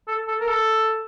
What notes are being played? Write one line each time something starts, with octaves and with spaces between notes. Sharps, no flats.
A4
A4
A#4
A4